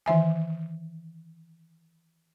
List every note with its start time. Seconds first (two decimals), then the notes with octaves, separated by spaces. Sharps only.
0.06 D#3 E3 E5 G#5